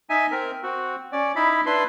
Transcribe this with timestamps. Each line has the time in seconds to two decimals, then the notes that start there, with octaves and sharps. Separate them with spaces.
0.10 D#4 E5 G#5
0.32 C4 A#4
0.63 C4 F#4
1.12 C#4 D5
1.36 D#4 E4 B5
1.66 D4 E4 B4 C6